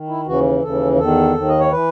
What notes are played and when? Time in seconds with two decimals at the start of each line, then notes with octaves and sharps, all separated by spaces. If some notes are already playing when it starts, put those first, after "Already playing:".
Already playing: D#3
0.08 E4
0.26 D#2 C#3 E3 F#4
0.63 D#2 C#3 E3 A4
0.99 E2 D#3 A4
1.35 D#2 D#3
1.48 D#5
1.60 C#5
1.71 E3 B4